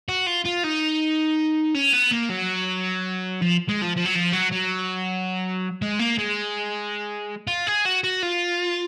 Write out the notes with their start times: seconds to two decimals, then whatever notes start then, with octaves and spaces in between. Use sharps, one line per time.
0.08 F#4
0.26 F4
0.45 F4
0.63 D#4
1.75 C#4
1.93 B3
2.12 A#3
2.30 F#3
3.42 F3
3.69 G#3
3.82 F3
3.97 F3
4.06 F#3
4.16 F3
4.33 F#3
4.52 F#3
5.82 G#3
5.99 A#3
6.18 G#3
7.47 F4
7.67 G#4
7.85 F#4
8.04 F#4
8.22 F4